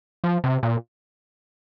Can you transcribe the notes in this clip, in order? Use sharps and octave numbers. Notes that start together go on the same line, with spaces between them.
F3
C3
A#2